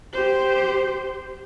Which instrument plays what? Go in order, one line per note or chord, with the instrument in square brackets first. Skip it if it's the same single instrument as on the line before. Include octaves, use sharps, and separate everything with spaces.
[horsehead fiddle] G4 C5